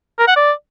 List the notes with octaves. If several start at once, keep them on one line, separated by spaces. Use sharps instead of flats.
A#4
F#5
D5